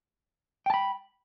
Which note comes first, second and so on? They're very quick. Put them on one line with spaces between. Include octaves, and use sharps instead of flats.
G5 A5 B5